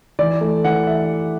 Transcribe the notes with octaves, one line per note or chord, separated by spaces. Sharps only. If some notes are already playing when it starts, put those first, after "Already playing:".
E3 D5
A3
E3 F#5
E5